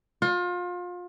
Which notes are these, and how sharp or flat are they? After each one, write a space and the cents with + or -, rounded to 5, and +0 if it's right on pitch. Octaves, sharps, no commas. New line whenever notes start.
F4 +30